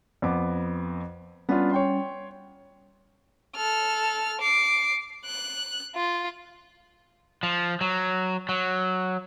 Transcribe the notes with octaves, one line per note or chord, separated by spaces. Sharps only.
F2 B3 D6
G3 B3 C#4 D4 F4
C#5 G5 C6
A4 F6
D6 C7
F#6
F4
F3
F#3
F#3